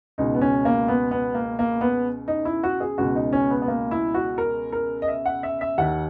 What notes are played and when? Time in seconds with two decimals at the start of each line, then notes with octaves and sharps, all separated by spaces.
0.18 C#2 B2 D#4
0.34 B3
0.42 C#4
0.65 A#3
0.88 B3
1.11 B3
1.34 A#3
1.59 A#3
1.81 B3
2.28 D#4
2.45 E4
2.63 F#4
2.80 G#4
2.98 C#2 B2 F#4
3.15 D#4
3.33 C#4
3.50 B3
3.62 B3
3.68 A#3
3.91 E4
4.14 F#4
4.38 A#4
4.72 A#4
5.02 D#5
5.08 E5
5.26 F#5
5.43 E5
5.61 E5
5.78 D#2 D#3 F#5